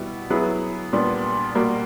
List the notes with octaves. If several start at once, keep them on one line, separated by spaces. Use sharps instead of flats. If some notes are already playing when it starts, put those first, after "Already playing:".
Already playing: B2 G3 B3 E4
F#3 B3 E4 G#4 B4
A#2 G3 B3 D4
B2 G3 A#3